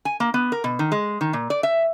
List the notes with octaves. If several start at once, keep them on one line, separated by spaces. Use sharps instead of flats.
G#5
A#3
B3
A#4
B2
D#3
G#3
D#3
A#2
D5
E5